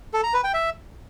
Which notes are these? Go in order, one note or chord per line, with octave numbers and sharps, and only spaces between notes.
A4
A#5
B4
G5
E5